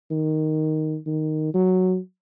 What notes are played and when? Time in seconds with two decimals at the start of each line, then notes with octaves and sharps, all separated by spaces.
0.11 D#3
1.06 D#3
1.54 F#3